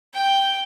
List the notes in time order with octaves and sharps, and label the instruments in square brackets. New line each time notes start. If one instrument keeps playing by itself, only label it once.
[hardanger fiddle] G5